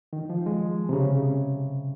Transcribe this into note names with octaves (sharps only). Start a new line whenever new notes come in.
D#3
F3
G#3
C3
C#3